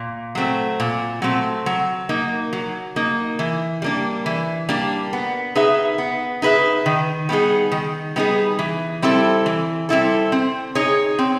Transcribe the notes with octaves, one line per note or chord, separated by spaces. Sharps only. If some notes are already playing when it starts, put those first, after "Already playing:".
Already playing: A#2
F#3 A3 C4
A#2
F#3 A3 C4
F#3
A#3 D#4
F#3
A#3 D#4
E3
G3 A#3 D4
E3
G3 A#3 D4
B3
D#4 G#4 B4 E5
B3
D#4 G#4 B4 E5
D#3
G3 B3 D#4 G#4
D#3
G3 B3 D#4 G#4
E3
G3 C4 E4 A4
E3
G3 C4 E4 A4
C4
D#4 G#4 C#5
C4